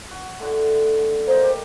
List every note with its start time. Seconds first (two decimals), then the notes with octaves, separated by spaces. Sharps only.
0.11 F#4
0.39 A2 D3 F#4
1.27 A#3 C5 D#5
1.43 G4